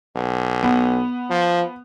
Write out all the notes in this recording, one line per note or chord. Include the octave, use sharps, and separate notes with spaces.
B1
B3
F3